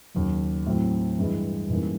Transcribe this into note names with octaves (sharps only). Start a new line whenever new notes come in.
D#2 C#3 F#3
A2 F#3 A3 C4
G2 E3 G#3
G#2 E3 G3 A#3 C#4